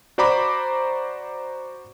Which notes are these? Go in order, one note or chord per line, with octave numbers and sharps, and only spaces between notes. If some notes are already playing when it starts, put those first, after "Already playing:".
F#4 C5 D5 A#5 B5 D6